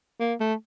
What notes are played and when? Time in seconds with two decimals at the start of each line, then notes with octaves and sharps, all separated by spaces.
0.20 A#3
0.40 A3